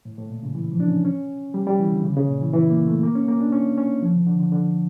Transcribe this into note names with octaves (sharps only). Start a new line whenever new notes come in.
A2
A2
A#2
C#3
E3
F3
D4
C#4
C#4
G3
G3
E3
D3
C#3
C#3
A#2
E3
E3
A#3
A3
A#3
C#4
A#3
D4
C#4
C#4
F3
D3
D3
D3
D3